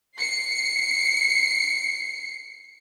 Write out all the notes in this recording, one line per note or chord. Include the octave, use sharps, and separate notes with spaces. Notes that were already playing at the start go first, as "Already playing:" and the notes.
C7 C#7